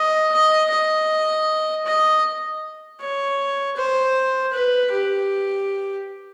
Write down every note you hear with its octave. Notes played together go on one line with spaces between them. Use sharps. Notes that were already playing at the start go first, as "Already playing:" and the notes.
Already playing: D#5
D#5
D#5
D#5
C#5
C5
B4
G4